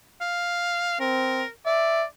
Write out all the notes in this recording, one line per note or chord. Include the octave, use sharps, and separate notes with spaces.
F5
C4 A#4
D5 E5